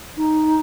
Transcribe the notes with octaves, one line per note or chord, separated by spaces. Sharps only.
D#4